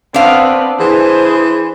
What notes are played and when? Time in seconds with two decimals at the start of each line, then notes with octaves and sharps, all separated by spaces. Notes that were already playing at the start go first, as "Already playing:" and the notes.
0.14 B3 C4 D4 F5
0.80 E3 G#4 C5